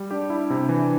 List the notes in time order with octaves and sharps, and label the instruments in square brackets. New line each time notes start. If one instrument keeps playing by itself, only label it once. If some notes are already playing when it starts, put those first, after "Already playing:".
Already playing: [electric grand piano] G3
[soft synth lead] D4 [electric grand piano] G4
[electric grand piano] E4
C3
E3